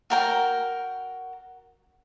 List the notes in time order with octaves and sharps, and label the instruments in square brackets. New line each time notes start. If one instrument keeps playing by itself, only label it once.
[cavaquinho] F#4 A#4 G5